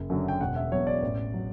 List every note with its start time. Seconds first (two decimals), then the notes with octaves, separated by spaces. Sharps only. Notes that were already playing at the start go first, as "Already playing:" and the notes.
Already playing: F#1
0.10 F#2 D3 F#3
0.28 G5
0.41 E1 F#5
0.56 E5
0.72 E2 B2 F#3 C#5
0.87 D5
1.02 A1
1.34 F#3